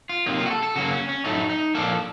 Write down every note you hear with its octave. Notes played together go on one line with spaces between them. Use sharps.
F4
C3 F#3 A#3 D#4
F4
F#4
A4
A4
C#3 F#3 A#3 F#4
C#4
C#4
A2 F#3 A3 D#4
D#4
A#2 F3 A#3 A4